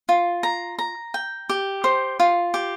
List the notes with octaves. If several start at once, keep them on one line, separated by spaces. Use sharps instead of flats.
F4
A#5
A#5
G5
G4
C5
F4
G4